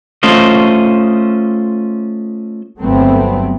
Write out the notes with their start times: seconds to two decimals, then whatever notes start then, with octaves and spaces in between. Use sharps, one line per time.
0.23 A3 C#4 F4 C5 D#5
2.80 G1 F#3 A3 B3 C4